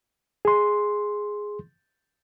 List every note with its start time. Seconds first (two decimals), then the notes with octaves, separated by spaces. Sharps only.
0.45 G#4 C6